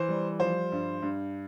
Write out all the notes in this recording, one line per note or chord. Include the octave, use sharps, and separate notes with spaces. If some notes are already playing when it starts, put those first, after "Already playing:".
Already playing: E3 C5
G3
F3 C5
G2
G2